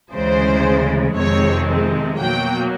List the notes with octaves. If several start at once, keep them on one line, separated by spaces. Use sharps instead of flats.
D2 C#3 E3 G#3 C5
F2 C3 D#3 G#3 C4 C#5
B2 F#3 A#3 G5